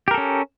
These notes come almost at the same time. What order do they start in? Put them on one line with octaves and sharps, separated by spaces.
G4 A#4 A4 C#4